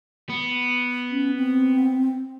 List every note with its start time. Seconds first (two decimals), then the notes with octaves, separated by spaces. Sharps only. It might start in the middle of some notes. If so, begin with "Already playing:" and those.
0.29 B3
1.11 C#4
1.36 C4